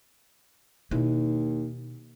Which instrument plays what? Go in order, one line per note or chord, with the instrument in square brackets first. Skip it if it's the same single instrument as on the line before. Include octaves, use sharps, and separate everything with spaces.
[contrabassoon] D#2 [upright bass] B2 E4